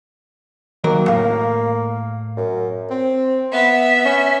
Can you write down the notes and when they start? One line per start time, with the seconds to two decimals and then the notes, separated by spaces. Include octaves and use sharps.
0.84 D#2 F#3 A#3 A#4
1.08 A2 F5
2.37 F#2
2.90 C4
3.54 B3 E5
4.05 C#4